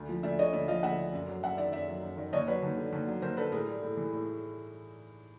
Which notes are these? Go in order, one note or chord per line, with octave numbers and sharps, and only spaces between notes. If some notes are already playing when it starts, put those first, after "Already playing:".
Already playing: D2
F3
D2 D5 E5
D3 C#5 D#5
D2 D5 E5
F3 D#5 F5
D2 E5 F#5
D3
F#2
F#3
F#2 E5 F#5
D#3 D5 E5
F#2 D5 E5
F#3
F#2
D#3
D#2 C#5 D#5
F#3 B4 C#5
D#2
D3
D#2
F#3
D#2 A#4 C5
D3 A4 B4
A2 G#4 A#4
G3
A2
E3
A2